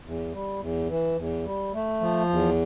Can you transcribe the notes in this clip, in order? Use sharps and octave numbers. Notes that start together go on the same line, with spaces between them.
E2
G3
E2
E3
E2
G3
A3
F3
E2